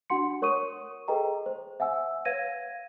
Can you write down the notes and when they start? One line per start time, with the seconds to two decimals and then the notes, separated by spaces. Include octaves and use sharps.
0.10 D4 F#4 F#5 C6 C#7
0.42 A#4 C#5 C#6 D#6 D#7
1.08 G#4 A4 B4 D#5 G5 A#5
1.46 C5
1.80 E5 F#5 G#5 E6
2.25 B4 C#5 F5 G#6 A#6 D#7